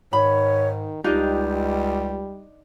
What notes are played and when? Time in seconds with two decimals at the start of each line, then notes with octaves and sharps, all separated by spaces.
0.13 G#2 D#3 C#5 B5
1.04 C#2 G3 D4 D#4 F4 G4